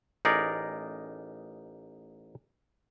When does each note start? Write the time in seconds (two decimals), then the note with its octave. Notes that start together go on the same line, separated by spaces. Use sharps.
0.25 A1 D#4 G#4 A#4 D5